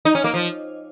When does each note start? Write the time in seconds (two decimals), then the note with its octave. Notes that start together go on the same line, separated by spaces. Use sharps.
0.05 D#4
0.15 C#4
0.24 A#3
0.34 F3